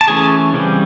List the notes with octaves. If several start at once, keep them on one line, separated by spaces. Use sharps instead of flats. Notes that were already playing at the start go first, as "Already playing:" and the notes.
A5
E3 A3 C#4 G#4 G#5
C#3 E3 G3 C4